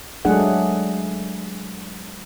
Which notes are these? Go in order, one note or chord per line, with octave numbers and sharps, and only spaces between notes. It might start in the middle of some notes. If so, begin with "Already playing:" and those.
F#3 G#3 A3 D4 G#4 F#5